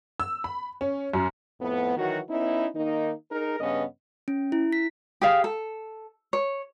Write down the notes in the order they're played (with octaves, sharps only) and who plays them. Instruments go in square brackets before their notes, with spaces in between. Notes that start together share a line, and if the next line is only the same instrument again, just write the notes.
[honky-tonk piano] E6
B5
C#4
F#2
[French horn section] F2 A2 B3
D#3 E3 F#3 F#4
B3 C#4 D#4 E4
D#3 A#3 D#4
D#4 G#4 A#4
G2 C#3 B3 C#4 D#5
[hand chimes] C#4
E4
B6
[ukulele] G4 G#4 F5
A4
C#5